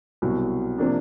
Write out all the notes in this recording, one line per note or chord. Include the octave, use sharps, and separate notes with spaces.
C2 B2 F#3
C3 F3 A#3 D4